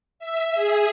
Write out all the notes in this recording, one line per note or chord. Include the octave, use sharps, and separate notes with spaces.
E5
G#4